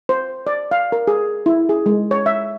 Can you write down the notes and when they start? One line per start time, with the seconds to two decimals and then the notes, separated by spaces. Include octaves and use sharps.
0.09 C5
0.47 D5
0.71 F5
0.92 A#4
1.08 G#4
1.46 E4
1.69 G#4
1.86 G#3
2.11 C#5
2.26 E5